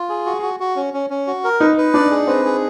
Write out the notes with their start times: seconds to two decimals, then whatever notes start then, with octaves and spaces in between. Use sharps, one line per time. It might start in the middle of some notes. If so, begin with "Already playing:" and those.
Already playing: F4
0.09 G#4
0.26 F#4
0.42 F#4
0.60 F#4
0.76 C#4
0.94 C#4
1.10 C#4
1.27 F#4
1.44 A#4
1.60 D#4 B4
1.77 B4
1.94 D4 D5
2.11 G#4
2.27 C4 B4
2.45 G#4